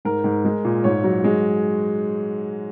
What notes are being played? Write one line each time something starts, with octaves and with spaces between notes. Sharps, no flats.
G#2 A#4
G#2
G#3
A#2
G#2 C#5
F#3
G#3